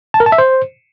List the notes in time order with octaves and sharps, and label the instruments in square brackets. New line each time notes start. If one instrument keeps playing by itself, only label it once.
[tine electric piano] A5
A#4
A5
E5
C5